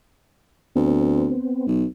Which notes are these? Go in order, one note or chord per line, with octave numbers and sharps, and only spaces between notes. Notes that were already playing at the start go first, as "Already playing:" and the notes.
D2 B3 C4
B1